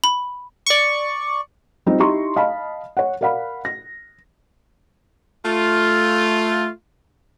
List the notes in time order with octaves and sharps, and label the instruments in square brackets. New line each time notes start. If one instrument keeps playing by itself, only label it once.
[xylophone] B5
[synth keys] D5 C#6
[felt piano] G3 C4 D#4 F4
D#4 E4 G4 A#5 C6 C#6
D#5 F5 A5 B5
C#5 F#5
A#4 D5 F5 F#5 B5
A#6
[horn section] A3 F4